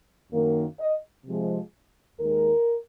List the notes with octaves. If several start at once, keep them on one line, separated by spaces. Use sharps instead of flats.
F#2 D#3 A#3
D#5
C3 F3 G#3
D#2 D#3 G#3 A#4